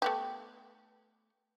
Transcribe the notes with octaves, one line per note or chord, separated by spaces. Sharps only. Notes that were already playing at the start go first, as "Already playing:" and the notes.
A3 B3 G4